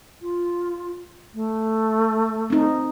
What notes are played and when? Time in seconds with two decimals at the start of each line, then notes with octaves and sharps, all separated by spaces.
0.22 F4
1.34 A3
2.50 C4 D#4